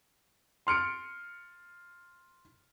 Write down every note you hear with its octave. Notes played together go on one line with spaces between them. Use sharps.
C6 F6 C#7 D7